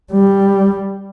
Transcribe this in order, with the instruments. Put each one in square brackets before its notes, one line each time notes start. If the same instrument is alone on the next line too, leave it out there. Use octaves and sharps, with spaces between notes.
[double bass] G3